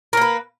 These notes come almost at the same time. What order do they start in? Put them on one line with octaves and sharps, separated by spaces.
A#4 A#3 B4